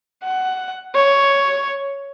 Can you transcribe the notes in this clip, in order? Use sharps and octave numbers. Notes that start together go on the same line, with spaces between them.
F#5
C#5